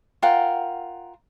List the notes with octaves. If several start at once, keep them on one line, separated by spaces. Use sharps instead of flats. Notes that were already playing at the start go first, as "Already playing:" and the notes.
F4 A#4 F#5 G5